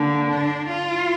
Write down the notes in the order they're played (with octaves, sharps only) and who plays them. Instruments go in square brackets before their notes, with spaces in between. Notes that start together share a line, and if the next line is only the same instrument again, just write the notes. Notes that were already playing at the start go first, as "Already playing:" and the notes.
Already playing: [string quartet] D3 [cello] A#3
[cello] D4
F4